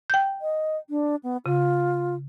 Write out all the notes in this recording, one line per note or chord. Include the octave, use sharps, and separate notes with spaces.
G5 G6
D#5
D4
B3
C#3 F4